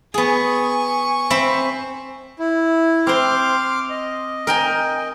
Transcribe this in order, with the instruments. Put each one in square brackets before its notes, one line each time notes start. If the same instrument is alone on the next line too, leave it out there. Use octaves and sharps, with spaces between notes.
[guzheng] B3 G#4 [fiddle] G#5 C#6
[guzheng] C4 E5 B5
[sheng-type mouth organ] E4
[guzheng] C4 C5 [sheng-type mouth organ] C6 D6 F6
[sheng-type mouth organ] D#5
[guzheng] A#4 G5 G#5